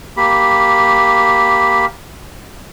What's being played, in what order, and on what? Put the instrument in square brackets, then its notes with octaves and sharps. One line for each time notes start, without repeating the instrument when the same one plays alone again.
[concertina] A#3 G4 B5